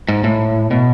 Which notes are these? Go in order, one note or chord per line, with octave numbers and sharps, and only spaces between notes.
G#2
A2
B2